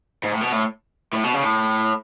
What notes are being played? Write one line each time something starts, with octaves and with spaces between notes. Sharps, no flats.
G#2
A2
B2
A2
A2
B2
C#3
A2